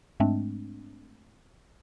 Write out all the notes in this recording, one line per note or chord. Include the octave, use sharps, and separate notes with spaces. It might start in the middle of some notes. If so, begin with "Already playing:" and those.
G#2 G#3 A3 C4 D4